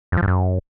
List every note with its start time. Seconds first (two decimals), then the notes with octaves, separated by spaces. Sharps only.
0.12 F2
0.17 F3
0.22 G2
0.28 F#2